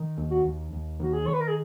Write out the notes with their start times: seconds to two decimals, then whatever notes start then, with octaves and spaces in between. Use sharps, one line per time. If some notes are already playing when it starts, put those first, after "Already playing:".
Already playing: D#3
0.17 D#2
0.31 F#4
0.44 D#2
0.72 D#2
0.99 D#3 F#4
1.13 G#4
1.27 D#3 C#5
1.34 B4
1.41 A#4
1.48 G#4